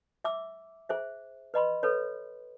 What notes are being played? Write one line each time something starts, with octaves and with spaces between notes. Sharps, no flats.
E5 D6 E6
G#4 C5 E5
B4 D#5 B5 C6
A4 B4 C#5